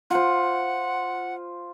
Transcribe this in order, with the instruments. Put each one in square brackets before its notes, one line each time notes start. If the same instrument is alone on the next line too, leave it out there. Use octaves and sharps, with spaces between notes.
[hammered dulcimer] F4 C5 [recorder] F#5